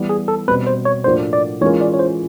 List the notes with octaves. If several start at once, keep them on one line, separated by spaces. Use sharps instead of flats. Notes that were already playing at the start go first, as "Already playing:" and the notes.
Already playing: E3 G3 B3
G#4
A4
B2 G3 C4 B4
C5
C#5
A2 F3 A#3 D4 F#4 C5
D5
E3 G#3 C#4 F4 A#4 C#5
D5
C#5
C5